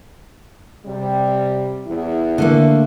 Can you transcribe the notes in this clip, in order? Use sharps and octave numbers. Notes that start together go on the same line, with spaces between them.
C3 G3
E2 E4
D3 A3 A#3